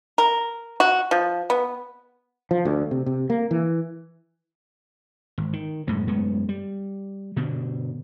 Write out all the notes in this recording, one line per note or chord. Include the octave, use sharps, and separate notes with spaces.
A#4
F#4
F3
B3
F3
D2
C3
C3
A#3
E3
G#1
D#3
F#2 A2 G#3 A3
F#2 G#3 A3 B3
G3
G2 B2 D3